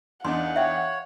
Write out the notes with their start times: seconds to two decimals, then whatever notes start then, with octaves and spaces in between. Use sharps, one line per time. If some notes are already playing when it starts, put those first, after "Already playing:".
0.25 E2 D4 D#4 F5 F#5 C6
0.56 C#5 E5 G5